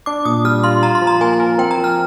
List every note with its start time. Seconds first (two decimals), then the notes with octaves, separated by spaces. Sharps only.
0.06 D4 D6
0.25 A#2 D#6
0.44 G3 F6
0.64 F4 C6
0.83 F4 A#5
0.95 C6
1.02 F3
1.07 A#5
1.21 A#3 G#5
1.40 A#4
1.58 C4 G5
1.71 A#5
1.78 F3
1.84 F6